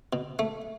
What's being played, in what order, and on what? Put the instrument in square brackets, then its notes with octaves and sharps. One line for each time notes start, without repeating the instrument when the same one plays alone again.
[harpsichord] B2
A3